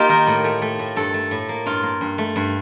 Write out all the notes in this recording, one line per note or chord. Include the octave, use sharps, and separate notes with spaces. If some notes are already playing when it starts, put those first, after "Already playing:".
Already playing: A#3 D#4 F4 G4
D#3 A#4
A2
A3
A3
A2
G2 A4
A3
A2
A#3
G2 F4
A#3
G2
A3
G2